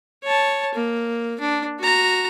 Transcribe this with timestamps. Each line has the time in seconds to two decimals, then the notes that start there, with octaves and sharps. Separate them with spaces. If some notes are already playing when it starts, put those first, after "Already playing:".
0.23 C#5 A5
0.74 A#3
1.40 D4
1.79 F#4 A#5